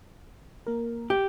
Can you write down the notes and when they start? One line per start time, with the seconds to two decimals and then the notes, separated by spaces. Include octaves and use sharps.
0.67 A#3 A#4
1.10 G4